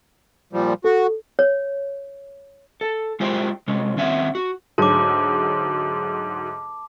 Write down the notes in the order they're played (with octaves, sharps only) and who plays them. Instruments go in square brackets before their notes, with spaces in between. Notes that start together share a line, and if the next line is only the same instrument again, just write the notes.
[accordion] A#2 F3 G3
[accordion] F#4 [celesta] A4
[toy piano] C#5
[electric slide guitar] A4
G#3 E4 F4 G4 C5 G5
C3 G#3 C#4
D#3 C4 C#4 E5 F#5
F#4
[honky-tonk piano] D2 G#2 F#3 [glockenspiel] A5 D6